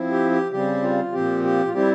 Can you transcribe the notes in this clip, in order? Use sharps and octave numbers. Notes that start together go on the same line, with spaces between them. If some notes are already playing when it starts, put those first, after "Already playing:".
Already playing: F3 C4 E4
G4
G4
C#3 G3 C4 G4
F4
A#2 F3 C4 G4
G4
F4
G3 C4 E4 G4